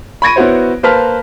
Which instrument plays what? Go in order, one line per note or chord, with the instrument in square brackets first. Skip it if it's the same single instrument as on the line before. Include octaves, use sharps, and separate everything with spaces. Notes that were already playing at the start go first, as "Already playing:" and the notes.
[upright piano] B5 C#6 G#6 A#6 D7 D#7
B3 E4 F#4 C5 C#5
A#3 B4 C5 A5 F6 B6